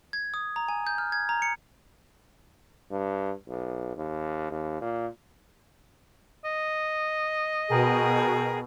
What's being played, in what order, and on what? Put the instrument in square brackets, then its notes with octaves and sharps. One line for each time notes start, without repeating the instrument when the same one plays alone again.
[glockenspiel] G#6
D#6
A#5
G#5
G6
F6
G#6
A#5
C#7
[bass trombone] G2
B1
D#2
D#2
A#2
[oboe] D#5
[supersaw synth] B2 [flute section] G#4 A#4 G5